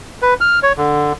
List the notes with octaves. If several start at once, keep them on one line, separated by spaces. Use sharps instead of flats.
B4
F6
C#5
D3